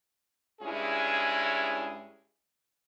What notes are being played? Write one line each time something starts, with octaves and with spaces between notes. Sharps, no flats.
G2 G#3 C#4 E4 G#4